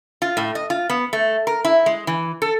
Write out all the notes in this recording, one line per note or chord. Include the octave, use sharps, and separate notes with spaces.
F4
A2
D#5
F4
B3
A3
A#4
E4
G#3
E3
A4